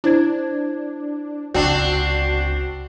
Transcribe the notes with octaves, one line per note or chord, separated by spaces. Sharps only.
D4 E4 C5 G#6
F1 C#2 C4 D4 F#4